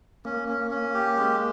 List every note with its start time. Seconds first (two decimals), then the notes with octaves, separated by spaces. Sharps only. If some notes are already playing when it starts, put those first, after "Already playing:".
0.25 A#3 C#4
0.48 C#4
0.71 C#4
0.94 G4
1.17 G#3